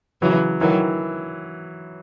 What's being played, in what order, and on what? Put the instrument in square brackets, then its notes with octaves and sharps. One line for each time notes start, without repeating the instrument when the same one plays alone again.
[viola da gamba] C#3 E3 [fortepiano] F#3
[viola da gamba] D#3 F#3 [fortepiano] E3